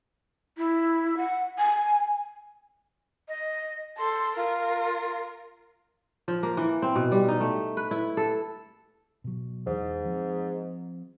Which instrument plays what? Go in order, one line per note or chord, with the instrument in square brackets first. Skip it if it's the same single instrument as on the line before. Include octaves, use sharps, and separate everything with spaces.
[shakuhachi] E4
F#5
G#5
[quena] D#5
[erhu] A4 [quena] C6
[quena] F4 [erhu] A#4
[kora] F3
A#3
E3
C4
B2
G3
D#4
A3
B4
E4
A4
[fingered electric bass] B2 F#3
[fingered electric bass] E2 E3 [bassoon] G#2
[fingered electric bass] F3 C4